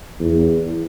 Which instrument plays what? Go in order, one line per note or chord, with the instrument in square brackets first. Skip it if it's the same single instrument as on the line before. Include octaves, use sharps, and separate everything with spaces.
[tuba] E2